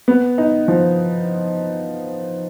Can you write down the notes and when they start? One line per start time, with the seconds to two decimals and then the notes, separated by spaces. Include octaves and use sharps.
0.08 B3
0.38 D#4
0.68 F3